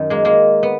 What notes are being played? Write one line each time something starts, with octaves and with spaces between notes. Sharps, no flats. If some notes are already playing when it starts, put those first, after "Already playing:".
Already playing: F#2 D#3
G#3 A#3
G#3 A#3
B3